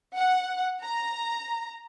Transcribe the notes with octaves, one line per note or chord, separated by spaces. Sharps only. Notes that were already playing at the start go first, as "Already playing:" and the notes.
F#5
A#5